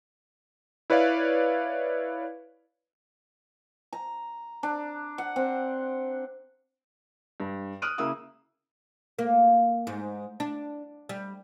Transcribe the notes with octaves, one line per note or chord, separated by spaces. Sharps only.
E4 B4 C#5 D5 F5
A#5
D4
F#5
C4
G2
D#6 F6 F#6 D7 D#7
C#3 A#3 E4 D#6 E6
A#3
G#2
D4
G3